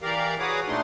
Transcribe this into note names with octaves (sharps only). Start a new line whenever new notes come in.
E3 G4 A#4 D5 F5 A#5
F#4 G#4 B4 C#5 D6 D#6
A#2 A3 D4 D#4 C6